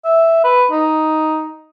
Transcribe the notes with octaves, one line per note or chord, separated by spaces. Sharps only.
E5
B4
D#4